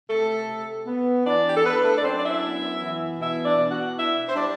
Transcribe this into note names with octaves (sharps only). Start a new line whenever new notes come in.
C3 A3 A4
C3
B3
E3 D4 D5
G4
A4
B3 D4 B4
A3 A4
D5
F#2 C4 C5
D5
E4 E5
B3
E3
B2 E4 E5
D4 D5
B2
F#4 F#5
D4 E4 E5
C5
G3 D4 D5